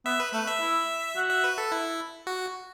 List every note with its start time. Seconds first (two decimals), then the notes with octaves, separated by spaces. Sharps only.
0.06 B3 E5
0.20 B4
0.33 A3 B4
0.47 E5
0.61 E4
1.17 F#4
1.30 E5
1.44 B4
1.58 A4
1.72 E4
2.27 F#4